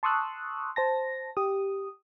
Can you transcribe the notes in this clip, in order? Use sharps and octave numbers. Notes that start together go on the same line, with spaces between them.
A5 C6 C#6 D#6 E6 F#6
C5 A5 A#6
G4 D#6